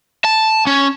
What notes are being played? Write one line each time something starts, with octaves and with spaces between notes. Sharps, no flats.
A5
C#4